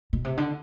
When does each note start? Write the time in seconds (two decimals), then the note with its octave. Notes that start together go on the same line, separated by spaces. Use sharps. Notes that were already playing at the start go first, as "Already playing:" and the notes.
0.13 B2
0.25 C3
0.37 D3